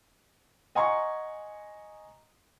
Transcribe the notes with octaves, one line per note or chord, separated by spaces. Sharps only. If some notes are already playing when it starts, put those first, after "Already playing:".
D#5 F#5 G#5 A#5 C6 C#6